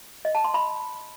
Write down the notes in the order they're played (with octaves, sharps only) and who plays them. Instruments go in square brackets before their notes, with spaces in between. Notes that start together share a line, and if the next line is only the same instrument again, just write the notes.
[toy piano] D#5
A5
C6
B5